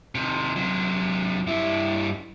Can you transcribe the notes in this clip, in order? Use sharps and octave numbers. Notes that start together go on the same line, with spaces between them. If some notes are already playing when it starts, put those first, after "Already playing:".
C3 D#3
C3 F#3
G2 E4